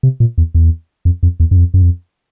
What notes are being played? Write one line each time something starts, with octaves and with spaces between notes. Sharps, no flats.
C3
A#2
E2
E2
F2
F2
E2
F#2
F2
F#2
F2